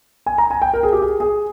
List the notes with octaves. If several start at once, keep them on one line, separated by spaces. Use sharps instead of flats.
G#5
A#5
G#5
G5
A#4
G#4
G4
G#4
G#4